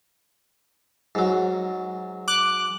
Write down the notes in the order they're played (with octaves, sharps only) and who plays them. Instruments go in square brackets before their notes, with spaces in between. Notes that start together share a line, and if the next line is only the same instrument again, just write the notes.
[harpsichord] G#2 F#3
[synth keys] D6 F#6